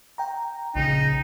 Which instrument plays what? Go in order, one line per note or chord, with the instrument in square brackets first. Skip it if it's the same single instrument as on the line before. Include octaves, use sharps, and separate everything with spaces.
[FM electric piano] G5 A#5
[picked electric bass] A#1 C#3 [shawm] D#4